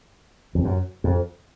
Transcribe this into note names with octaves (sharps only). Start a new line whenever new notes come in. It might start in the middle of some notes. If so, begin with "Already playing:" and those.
F2
F#2
F2